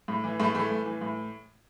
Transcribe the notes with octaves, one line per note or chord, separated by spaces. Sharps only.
A2
E3
A2 A3
A2 E3 A3
A2
E3
A2